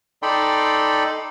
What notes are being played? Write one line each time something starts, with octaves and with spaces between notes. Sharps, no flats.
D#4 A4 D5 G5 B5 C6